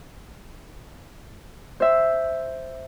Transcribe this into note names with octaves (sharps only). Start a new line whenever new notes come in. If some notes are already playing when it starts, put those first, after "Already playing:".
C5 E5